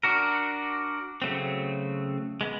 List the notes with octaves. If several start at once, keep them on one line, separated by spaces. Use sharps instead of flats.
D4 F#4 A#4
C#3 F#3 A3 C4
G#3 B3